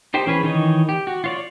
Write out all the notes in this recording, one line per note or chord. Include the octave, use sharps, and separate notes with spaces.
D#4 G4 C5 G5
E3 C#4 G#4 B4
D#3 E3 D#4 C#5 D#5
G4
F#4
F4 C#5 D5